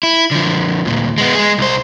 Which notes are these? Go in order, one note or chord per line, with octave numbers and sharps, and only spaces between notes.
E4
D3 F3
D2 A#2
G#3 B3
G#3 G#4
C2 C5